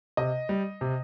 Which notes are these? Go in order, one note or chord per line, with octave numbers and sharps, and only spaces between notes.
C3 D#5
G3
C3